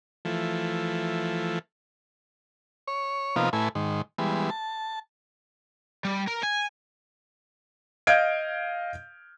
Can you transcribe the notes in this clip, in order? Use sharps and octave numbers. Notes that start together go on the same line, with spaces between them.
E3 F3 A3
C#5
C3 F3 A#3 B3 D#4 F4
A2 A3 E4 B4 G#5
G#2 D#3
E3 G3 G#3 B3
A5
G3
A#4
G#5
D#5 F5 F6 G6 G#6 D7